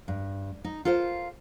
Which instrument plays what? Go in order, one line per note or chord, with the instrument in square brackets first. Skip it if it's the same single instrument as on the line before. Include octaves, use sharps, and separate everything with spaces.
[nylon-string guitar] G2
D#4
F4 A4 A#4 C5 F5